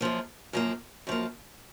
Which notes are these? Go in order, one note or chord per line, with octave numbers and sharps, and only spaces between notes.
F#2 F3 A#3
F#2 F3 A#3
F#2 F3 A#3